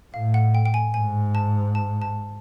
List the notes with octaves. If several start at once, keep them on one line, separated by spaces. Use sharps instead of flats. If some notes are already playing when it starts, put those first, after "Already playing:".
A2 F5
F#5
G5
G5
G#5
G#2 G#5
A5
A5
A5